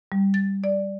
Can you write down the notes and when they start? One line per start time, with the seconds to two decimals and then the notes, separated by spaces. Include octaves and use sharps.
0.12 G3
0.34 A6
0.64 D5